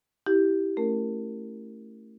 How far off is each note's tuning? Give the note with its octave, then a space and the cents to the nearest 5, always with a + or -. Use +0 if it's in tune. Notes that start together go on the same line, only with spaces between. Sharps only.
E4 -20 G4 -10
A3 +10 C#4 +0 A#4 -15